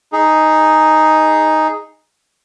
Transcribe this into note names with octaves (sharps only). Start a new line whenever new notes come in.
D#4 G#4